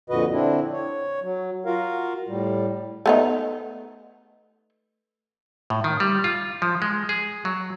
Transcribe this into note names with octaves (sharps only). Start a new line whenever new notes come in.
F2 A#2 D3 F#4 B4 D#5
D3 C4 D4 E4
C#5
F#3
F4 F#4 A#4 F5
A2 G3
A3 B3 D#4
A2
D#3
G3
F4
F3
G#3
G#4
F#3